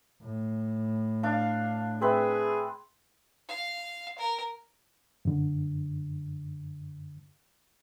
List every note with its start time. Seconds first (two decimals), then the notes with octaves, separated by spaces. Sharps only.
0.23 A2
1.23 D4 F5
2.01 C4 G#4 B4 E5
3.48 F5
4.18 A#4
5.25 F#2 D3